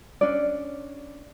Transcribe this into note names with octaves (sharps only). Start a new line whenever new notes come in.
C#4 D4 D5